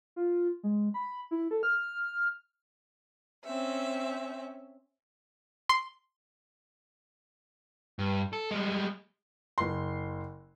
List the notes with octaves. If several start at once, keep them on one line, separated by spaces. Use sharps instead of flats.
F4
G#3
B5
E4
A4
F6
C4 C#4 E5
C6
G2
A4
G3 G#3
F#1 C6